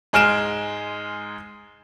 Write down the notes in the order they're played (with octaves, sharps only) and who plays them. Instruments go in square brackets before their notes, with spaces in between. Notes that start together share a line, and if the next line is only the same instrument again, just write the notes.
[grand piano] G#2 G#3 G#5 F6 D7 E7